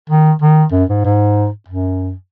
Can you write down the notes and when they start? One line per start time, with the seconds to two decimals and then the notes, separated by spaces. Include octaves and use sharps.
0.10 D#3
0.42 D#3
0.72 F#2
0.89 G#2
1.05 G#2
1.68 F#2